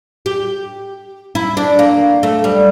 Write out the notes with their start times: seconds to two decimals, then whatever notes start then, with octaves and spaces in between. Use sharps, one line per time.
0.26 G4
1.35 E4
1.57 D4
1.79 A#3
2.23 A3
2.44 G3